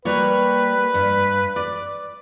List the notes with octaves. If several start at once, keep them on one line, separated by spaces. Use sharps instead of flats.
G3 A#3 B4 C#5
G2
D5